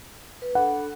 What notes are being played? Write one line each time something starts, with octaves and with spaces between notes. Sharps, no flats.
B4
D4 A4 F#5 B5